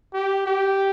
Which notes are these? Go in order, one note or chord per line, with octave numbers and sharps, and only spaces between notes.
G4
G4